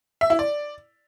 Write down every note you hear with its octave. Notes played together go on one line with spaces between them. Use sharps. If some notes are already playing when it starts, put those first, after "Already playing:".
E5
E4
D5